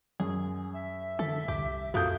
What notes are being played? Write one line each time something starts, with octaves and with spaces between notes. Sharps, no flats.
F#2 G#4
E5
D3 A4
C2 G4
F2 E3 F3 A#3 F#4 A4 D#6 G6